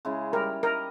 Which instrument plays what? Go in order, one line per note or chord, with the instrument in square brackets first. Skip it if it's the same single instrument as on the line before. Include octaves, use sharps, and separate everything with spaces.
[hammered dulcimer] C#3 G#3 E4
[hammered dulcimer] G3 [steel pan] A#4
[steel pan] A#4 [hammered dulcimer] D#5